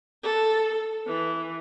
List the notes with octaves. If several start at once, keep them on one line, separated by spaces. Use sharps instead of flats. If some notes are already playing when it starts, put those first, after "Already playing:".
A4
E3